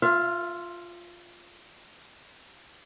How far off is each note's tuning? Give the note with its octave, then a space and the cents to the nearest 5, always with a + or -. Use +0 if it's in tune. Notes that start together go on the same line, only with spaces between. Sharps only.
F4 +5 E5 +40